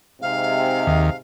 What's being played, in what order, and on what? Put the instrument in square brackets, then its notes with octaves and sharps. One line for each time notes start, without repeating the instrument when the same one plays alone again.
[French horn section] G#2 C3 [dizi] F5
[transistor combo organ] D#2